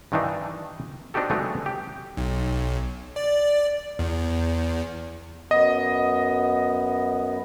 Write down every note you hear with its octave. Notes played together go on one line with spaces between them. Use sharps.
G2 D#3 E3 D4 D#4
C4 D4 D#4 F#4 G4 A4
F#3 G#3 A3 B3 D#4
G4
B1
D5
E2
F#2 B3 D#5